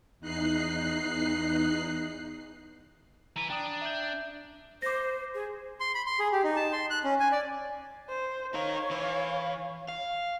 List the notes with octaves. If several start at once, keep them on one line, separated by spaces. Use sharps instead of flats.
E2 D#4 F#6 C7
E3 B4 A#5
D4 G5 A#5 D#6
E5 G6
C5 D6 A#6
G#4
C6
B5
C6
G#4
G4
D#4
A5
C6
F#6
C#4
G#5
D5
C5
D#4 A#4 C#5 F5
E3 B4
F5